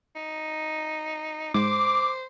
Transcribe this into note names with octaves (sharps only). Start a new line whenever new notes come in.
D#4
G#2 G#3 C5 D6